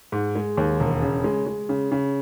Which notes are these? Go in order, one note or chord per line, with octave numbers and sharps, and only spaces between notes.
G#2
G#3
D#2
E1
C#3
G#3
G#3
C#3
C#3